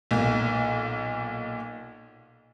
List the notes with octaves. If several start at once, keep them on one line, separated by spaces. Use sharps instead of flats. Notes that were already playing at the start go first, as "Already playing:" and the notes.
B1 A#2